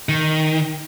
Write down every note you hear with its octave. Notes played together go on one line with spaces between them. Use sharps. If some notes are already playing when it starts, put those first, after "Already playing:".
D#3